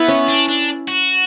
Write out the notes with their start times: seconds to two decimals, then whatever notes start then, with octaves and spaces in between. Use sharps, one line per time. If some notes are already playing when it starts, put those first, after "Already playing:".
Already playing: B3 E4 B4
0.08 C#4
0.27 D4
0.48 D4
0.88 F#4